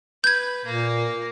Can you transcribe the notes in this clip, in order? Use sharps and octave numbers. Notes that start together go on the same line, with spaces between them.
B4 G6 G#6
A#2 A#3